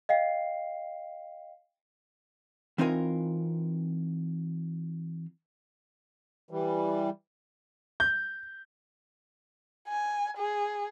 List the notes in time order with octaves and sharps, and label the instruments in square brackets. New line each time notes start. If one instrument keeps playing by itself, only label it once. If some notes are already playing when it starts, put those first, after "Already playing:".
[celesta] D#5 F5 G5 C7
[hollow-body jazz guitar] E3 C4 D#4 F4 A#4 G#5
[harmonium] E3 G3
[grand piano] G6
[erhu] G#5
G#4